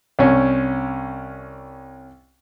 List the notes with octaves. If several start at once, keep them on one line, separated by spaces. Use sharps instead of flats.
C2 C#4